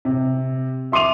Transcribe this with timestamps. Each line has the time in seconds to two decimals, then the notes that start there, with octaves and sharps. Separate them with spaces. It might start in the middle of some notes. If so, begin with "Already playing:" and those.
0.05 C3
0.92 E5 C6 D6 D#7 F7